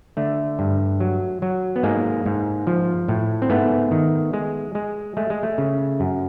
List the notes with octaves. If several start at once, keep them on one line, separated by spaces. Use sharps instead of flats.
D3 A3
G2
F#3
F#3
B3
G#2 G#3 A#3
G#2
F3
A2
C4
G#2 A3 B3
D#3
G#3
G#3
G#3 A3
G#3
A3
C#3
F#2